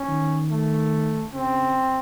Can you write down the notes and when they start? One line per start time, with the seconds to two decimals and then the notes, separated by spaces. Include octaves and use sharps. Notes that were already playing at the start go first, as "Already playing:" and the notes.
Already playing: C#4
0.09 D#3
0.50 A3
1.33 C#3 C4